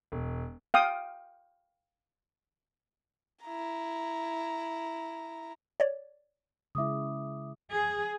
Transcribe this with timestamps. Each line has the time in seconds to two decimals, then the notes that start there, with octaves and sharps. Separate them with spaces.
0.12 E1
0.74 F5 G5 D#6
3.45 E4 A#5
5.80 C#5 D5
6.75 C#3 G#3 E4 E5 D6 D#6
7.74 G#4